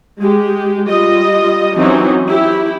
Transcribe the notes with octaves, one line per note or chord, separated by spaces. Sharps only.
G#3 G4
G3 F4 D#5
E3 F#3 C4 C#4 D#4
E4 G4